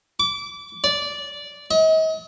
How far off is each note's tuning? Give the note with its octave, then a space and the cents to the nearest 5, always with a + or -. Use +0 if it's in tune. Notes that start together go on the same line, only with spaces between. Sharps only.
D6 -25
D5 -10
D#5 +40